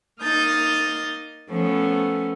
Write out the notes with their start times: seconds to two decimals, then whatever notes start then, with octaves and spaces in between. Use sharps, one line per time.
0.22 A#3 D#4 D#6 F6 G6 A6
1.49 F3 A3 B3 C#4